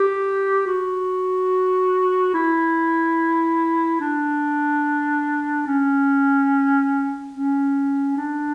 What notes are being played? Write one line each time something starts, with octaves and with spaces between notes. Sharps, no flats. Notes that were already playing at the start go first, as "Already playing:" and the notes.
Already playing: G4
F#4
E4
D4
C#4
C#4
D4